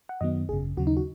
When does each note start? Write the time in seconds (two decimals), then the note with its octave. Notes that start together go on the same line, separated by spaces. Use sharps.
0.09 F#5
0.21 F#2 D#3 F#3 B3 D#5
0.49 G#1 F#2 C#3 G#4
0.77 D#2 C#3 F#3 F#4
0.87 D#4
0.97 F#4